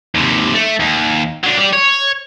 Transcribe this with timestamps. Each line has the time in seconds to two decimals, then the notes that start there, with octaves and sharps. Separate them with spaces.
0.15 D#2 C3
0.54 A3
0.80 D#2
1.44 F#3 D4
1.58 G4 D5
1.73 C#5